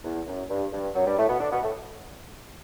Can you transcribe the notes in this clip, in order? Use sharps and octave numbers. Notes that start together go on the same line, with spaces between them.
E2
F#2
G2
G2
F#2 F#3
G2 G3
A2 A3
B2 B3
D3 D4
B2 B3
A2 A3